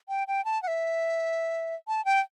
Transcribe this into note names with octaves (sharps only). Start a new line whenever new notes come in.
G5
G5
A5
F#5
E5
A5
G5